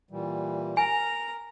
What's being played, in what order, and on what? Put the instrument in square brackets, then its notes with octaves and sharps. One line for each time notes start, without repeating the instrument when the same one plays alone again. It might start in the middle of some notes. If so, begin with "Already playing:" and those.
[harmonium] A#2 E3 G3
[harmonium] A#4 [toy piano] G#5 [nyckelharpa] A#5